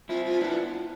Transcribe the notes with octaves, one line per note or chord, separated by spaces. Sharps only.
C4 E4 F4
F4
B3 D4 E4